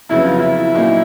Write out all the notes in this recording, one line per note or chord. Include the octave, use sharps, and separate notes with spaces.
F2 C#3 F#3 B3 E4
F4
E4
A#2 F#3 A#3 D#4